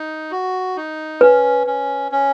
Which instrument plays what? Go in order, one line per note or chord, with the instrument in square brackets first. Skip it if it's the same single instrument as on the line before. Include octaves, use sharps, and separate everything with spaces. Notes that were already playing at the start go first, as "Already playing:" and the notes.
Already playing: [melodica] D#4
F#4
D#4
[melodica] C#4 [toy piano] B4
[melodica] C#4
C#4